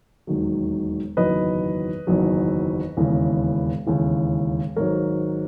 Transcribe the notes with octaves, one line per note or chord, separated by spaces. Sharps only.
E1 D#2 D#3 F#3
F#1 E2 D#3 F#3 B4 D#5
F#1 E2 D#3 F#3
E1 D#2 C#3 E3
E1 D#2 C#3 E3
G#1 G#2 F#3 A#4 C#5